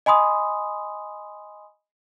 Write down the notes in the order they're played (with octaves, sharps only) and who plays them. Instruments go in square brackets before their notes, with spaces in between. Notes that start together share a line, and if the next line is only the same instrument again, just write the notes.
[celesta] D#5 G#5 B5 C6 D#6